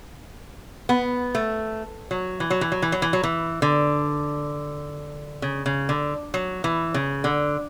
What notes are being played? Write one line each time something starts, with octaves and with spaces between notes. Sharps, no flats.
B3
A3
F#3
E3
F#3
E3
F#3
E3
F#3
E3
F#3
E3
D3
C#3
C#3
D3
F#3
E3
C#3
D3